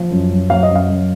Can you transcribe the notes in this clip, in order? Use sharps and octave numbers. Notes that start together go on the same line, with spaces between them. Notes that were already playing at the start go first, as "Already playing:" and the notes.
Already playing: F3
F#2
F#2
F#3 F5
D#5
F#2
F5
F#2